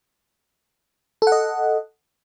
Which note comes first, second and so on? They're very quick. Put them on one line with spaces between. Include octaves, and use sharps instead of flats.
A4 F#5 D#5